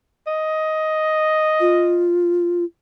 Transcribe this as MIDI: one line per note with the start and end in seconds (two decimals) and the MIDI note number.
0.27 2.11 75
1.60 2.64 65